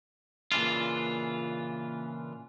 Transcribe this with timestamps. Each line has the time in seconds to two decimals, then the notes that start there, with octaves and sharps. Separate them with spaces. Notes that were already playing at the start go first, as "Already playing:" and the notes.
0.52 A#2 C#3 E3 D4 F4